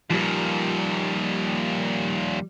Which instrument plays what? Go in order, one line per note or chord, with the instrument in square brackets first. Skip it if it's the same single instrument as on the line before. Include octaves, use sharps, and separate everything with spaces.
[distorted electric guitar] D#2 A#2 [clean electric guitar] F3 G3 B4